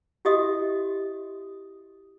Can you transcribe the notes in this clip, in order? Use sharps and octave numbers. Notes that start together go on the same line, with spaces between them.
E4 F#4 G4 D#5 E5 D#6